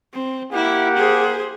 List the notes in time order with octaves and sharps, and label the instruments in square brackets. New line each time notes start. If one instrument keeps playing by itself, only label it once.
[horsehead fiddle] C4
[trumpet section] A#3 G4 F#5 [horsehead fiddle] E4
[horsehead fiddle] G#4 C5